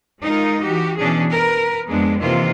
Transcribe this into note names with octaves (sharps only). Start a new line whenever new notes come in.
G#3 D#4 F4 A#4
E3 F#4 G4
B2 E3 C#4 D4 G#4
A#4 B4
F2 G#3 B3 D4
C3 D#3 E3 A#3 F4